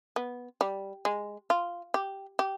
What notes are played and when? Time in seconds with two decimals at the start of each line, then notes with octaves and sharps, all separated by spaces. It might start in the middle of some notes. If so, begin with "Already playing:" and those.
0.16 B3
0.61 G3
1.05 G#3
1.50 F4
1.94 G4
2.39 G4